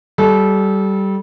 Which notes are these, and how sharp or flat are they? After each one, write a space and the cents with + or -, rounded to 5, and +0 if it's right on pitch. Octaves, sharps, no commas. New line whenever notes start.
G3 -15 A4 -30